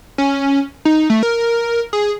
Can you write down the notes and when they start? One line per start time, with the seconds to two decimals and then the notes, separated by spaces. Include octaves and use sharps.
0.18 C#4
0.85 D#4
1.10 A3
1.23 A#4
1.93 G#4